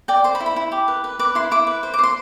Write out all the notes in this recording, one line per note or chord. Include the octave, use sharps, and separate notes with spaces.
D5 G5
C5 C6
B5
E4
B5
E4
G4
B4
B4
B4 D6
E4 C6
E4 D6
B4
C5
D6
C5 C6